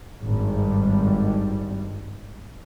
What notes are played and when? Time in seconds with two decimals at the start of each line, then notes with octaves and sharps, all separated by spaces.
0.24 G#1 G2 G3